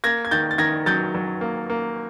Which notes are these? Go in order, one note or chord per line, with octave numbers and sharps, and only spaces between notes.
A#3 G#6 A#6
G#6
D#3 G6 A6
A6
D#3 G#6 A#6
F#3 G6 A6
F#3
A#3
A#3